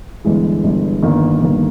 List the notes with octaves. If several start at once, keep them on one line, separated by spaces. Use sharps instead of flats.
G1 G2 E3 G#3
G1 G2 E3 G#3
G1 G2 D#3 A#3
G1 G2 D#3 A#3